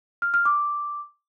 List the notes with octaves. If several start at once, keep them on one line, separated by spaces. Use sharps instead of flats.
F6
F6
D6